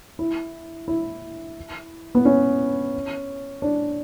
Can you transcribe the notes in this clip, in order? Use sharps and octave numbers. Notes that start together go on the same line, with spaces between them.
E4
E4
B3
C#4
D4